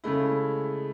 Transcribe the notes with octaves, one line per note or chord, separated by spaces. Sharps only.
C#3 G#3 A3 E4